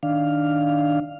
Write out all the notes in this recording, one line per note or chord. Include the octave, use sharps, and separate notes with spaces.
D#3 D4 F5